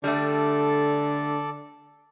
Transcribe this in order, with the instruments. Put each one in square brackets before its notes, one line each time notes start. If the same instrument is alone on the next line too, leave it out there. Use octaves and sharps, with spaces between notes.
[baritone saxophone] D3 [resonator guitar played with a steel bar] G3 A3 [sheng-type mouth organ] A4 D5